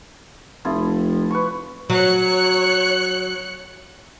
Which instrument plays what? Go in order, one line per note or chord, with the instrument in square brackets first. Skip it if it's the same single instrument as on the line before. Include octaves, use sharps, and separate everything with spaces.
[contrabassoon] F1 [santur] F3 E4
[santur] B4 C#6
[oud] F#3 [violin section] C#5 F#6 C#7